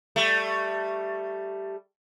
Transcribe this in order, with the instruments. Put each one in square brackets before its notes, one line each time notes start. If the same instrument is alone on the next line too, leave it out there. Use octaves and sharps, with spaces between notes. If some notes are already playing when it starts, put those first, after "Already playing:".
[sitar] G3 A3